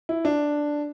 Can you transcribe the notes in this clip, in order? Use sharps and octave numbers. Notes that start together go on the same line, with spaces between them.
E4
D4